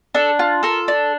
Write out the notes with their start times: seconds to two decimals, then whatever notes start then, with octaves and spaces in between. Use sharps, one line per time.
0.15 D4 A4
0.39 F4
0.63 A4 A#4
0.88 D4